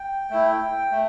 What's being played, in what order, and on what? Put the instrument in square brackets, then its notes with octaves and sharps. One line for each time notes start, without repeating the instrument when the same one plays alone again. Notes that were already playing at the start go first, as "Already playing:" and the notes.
Already playing: [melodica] G5
A3 E4
A3